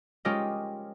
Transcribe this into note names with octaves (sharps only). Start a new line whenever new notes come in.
G#3 C#4 F4 G4 A#4 D#5